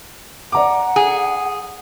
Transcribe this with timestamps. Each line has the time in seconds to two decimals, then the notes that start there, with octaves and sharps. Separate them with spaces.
0.52 D5 F#5 A#5 D6
0.96 G#4